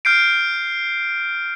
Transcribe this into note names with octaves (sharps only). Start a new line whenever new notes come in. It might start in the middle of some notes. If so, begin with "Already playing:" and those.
F6 G6 C7 D7